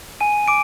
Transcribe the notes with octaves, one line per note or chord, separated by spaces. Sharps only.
G#5 D#7
D6 D7